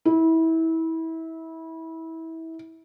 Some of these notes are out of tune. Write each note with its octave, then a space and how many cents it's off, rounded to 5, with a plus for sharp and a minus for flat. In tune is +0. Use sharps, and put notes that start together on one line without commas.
E4 -25